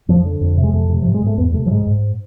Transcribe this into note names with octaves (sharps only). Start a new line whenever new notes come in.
F2 F3
D3
F2
C3
G#3
F2 A3
C3
G#2 F3
G#3
G#2 A3
E2 B3
C3 A3
F3
G#2 G#3
G#2